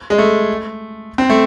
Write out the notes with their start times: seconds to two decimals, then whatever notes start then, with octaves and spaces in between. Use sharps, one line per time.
0.10 G#3
0.18 A3
1.18 C4
1.30 A3